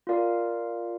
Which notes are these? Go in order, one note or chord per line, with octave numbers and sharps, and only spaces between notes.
F4 A#4 D5 F5